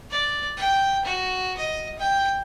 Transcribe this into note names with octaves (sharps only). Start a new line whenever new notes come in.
D5
G5
F#4
D#5
G5